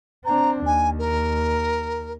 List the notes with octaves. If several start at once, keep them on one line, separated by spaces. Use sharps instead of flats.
C4 D4 A#5
D#2 G#5
A#4